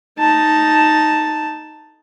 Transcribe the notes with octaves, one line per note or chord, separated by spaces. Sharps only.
D#4 A5